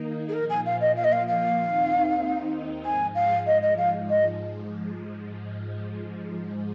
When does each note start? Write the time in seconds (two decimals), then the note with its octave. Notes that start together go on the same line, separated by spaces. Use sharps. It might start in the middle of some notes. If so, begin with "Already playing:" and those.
Already playing: D#3 A#3 D#4
0.28 G#4
0.33 A#2 F3 A#3 A#4
0.49 G#5
0.66 F5
0.81 D#5
0.96 F5
1.04 D#5
1.12 F5
1.28 F5
1.59 D#2 D#3 C4 D#4
2.84 G#2 F3 G#3 G#5
3.15 F5
3.47 D#5
3.62 D#5
3.77 F5
4.09 D#5